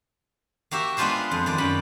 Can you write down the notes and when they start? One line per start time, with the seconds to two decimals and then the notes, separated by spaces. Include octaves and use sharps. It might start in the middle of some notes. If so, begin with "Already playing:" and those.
0.71 A#3 F#4 G4 E5
0.97 G#3 B3 D4 F4 B4 C5
1.31 F2
1.46 D#3 D5
1.58 F#2 B5